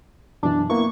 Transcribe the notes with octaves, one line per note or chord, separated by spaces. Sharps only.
F#2 B2 E3 D4
A#3 B3 E4 C#6